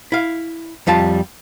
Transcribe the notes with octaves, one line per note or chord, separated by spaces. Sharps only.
E4 F5
F2 G3 F4 A5